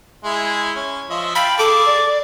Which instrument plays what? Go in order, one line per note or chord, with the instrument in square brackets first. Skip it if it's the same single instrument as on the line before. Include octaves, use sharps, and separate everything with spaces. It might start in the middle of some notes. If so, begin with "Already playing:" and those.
[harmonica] G#3 E4
C#4
F3 D#5 E5
[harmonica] F5 G5 A5 [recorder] B5
[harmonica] G#4 A5 [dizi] A4 [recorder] D6
[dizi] D5